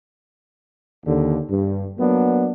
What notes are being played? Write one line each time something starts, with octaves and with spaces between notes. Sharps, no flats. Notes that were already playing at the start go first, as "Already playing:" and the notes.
D#2 D3
G2
F#3 A#3 B3 D4